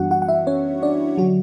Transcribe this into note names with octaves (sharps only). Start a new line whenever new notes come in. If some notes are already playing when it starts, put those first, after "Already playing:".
Already playing: F#2 E3 G3 B3 D4 F#4 F#5
F#4 F#5
F#5
E4 E5
C#4 C#5
D4 D5
D3 F#3 F#4